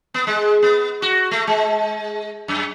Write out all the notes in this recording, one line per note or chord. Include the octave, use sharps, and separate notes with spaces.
B3
G#3
B3
F#4
A3
G#3
F#2